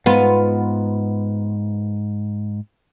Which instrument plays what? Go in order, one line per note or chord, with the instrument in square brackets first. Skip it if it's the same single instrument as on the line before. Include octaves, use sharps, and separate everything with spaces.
[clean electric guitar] E2 G#2 [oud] B3 F4